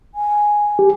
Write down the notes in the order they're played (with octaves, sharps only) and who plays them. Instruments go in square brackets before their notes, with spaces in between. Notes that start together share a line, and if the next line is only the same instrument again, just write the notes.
[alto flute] G#5
[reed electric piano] G4